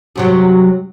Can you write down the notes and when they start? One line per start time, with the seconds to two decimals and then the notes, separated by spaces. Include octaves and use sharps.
0.16 F#2 C3 F#3